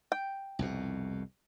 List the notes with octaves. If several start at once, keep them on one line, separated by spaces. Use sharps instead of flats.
G5
C2 F2 B2